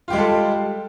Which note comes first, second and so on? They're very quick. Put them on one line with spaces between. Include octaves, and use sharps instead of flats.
F4 G4 G#3 G3 A4